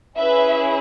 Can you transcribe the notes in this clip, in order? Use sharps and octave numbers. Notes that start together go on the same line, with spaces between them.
C#4 E4 G#4 B4 E5